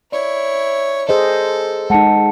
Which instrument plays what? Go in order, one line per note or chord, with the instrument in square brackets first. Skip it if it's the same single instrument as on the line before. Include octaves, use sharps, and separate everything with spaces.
[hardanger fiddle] E4 C#5 [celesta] D5
[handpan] G#4 C5 D#5 [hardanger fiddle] A4
[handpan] G#3 D#4 [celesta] F#5 A5 C#7